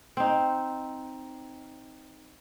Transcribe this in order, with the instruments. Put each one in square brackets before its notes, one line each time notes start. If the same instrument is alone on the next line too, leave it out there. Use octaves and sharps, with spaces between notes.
[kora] C4 D#4